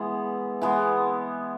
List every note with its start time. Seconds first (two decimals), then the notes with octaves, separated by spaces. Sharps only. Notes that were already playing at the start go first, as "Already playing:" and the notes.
Already playing: E3 G#3 B3
0.62 E3 G#3 B3